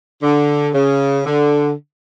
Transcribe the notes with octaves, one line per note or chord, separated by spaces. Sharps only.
D3
C#3
D3